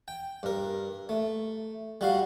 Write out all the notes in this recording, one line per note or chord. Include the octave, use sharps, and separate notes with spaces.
G5
G2 A#4
A3
G3 F#4 F5